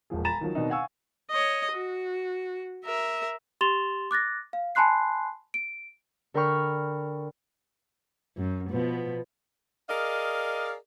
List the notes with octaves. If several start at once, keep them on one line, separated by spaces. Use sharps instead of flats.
E1 A#2 F3 G#4
G#5 A#5 B5 A6 E7
D#3 F3 F#3
B2 D#3 C4 D4 D#4
F5 F#5 G#5 C#6 E6
C#5 D#5
F#4
A#4 E5
G4 C6 A6 E7 F7 G7
D6 F#6 A6 A#6
F5
G#5 A5 B5 C6 F#6 C7
D7
D3 A#4 G5 B5 C#6 F6
F#2
B2 F3 B3
G#4 A#4 D5 D#5 F5